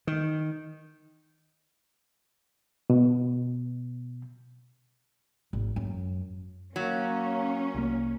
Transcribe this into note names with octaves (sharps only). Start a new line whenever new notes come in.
D#3
B2
G#1
F#2
F#3 A#3 C#4
C2 A#3